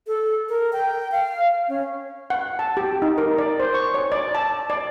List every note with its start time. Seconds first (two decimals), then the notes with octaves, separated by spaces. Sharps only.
0.07 A4
0.49 A#4
0.73 G5
1.12 F5
1.68 C#4
2.30 F#5
2.59 A5
2.77 G4
3.02 D#4
3.18 A#4
3.38 D5
3.60 C5
3.74 C#6
3.94 C#5
4.12 D5
4.35 A5
4.70 D5